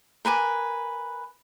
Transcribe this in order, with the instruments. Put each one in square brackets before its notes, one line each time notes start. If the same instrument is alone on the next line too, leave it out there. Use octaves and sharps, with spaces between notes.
[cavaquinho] A#4 B4 G#5 D6